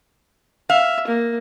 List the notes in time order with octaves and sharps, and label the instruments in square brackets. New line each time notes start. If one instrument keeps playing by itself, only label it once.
[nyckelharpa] E5 [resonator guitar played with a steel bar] F5
[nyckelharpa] A#3